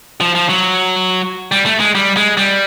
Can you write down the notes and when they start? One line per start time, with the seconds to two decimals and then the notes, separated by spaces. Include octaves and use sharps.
0.21 F3
0.35 F3
0.49 F#3
1.52 G3
1.66 A3
1.80 G#3
1.95 G3
2.17 G#3
2.37 G3